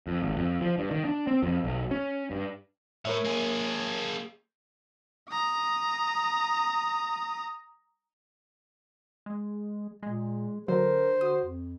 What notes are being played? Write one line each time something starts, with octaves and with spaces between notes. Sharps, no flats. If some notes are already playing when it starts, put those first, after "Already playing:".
F2
G#1
F2
F3
G2
D#3
D4
C4
F2
B1
C#4
G2
A2 A#4 C#5 E5
A#3 G#4
A#5 D#6
G#3
A#2 G#3
D3 F#3 A#4 C5
F#4 D#6
F2